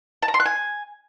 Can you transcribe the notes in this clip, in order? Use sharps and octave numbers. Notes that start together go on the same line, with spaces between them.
A5
A#5
C6
F#6
G#5